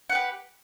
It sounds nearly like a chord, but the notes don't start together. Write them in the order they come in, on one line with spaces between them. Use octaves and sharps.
F#5 B4 G4